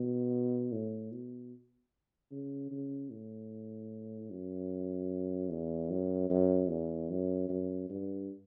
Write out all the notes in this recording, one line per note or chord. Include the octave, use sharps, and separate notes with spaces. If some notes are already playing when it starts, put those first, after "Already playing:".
Already playing: B2
A2
B2
C#3
C#3
A2
F#2
E2
F#2
F#2
E2
F#2
F#2
G2